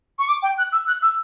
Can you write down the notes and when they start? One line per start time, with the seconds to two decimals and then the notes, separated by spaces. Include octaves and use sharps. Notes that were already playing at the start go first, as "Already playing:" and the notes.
0.19 C#6
0.28 D6
0.42 G5
0.58 F#6
0.72 E6
0.87 F#6
1.02 E6